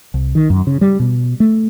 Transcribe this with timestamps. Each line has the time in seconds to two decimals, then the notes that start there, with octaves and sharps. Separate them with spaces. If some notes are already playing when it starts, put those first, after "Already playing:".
0.14 C2
0.35 D#3
0.50 F#2
0.67 C#3
0.81 G3
1.00 B2
1.40 A3